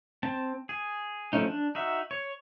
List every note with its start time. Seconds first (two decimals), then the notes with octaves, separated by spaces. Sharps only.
0.23 C4 A5
0.69 G#4
1.33 F3 G3 A3 C#4 D#4
1.47 D4
1.75 D#4 F#4 E5
2.11 C#5